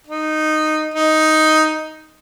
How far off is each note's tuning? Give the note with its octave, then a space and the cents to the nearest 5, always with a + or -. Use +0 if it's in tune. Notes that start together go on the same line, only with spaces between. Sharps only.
D#4 -10
D#4 +5